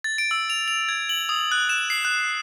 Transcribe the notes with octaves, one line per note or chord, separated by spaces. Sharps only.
A6
D7
E6
F7
F7
G#6
F#7
D#6
F#6
E7
C7
F#6